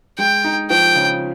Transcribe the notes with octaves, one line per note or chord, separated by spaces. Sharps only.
G#3 G5
D#4
F3 G5
C#3